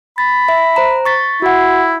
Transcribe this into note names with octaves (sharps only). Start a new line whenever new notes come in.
B5 A6
E5
C5 A#5
C#6 A6 B6
E4 F#4 F#5